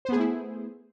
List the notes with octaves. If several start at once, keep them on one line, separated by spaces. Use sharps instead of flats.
A3 B3 E4 G#4 C5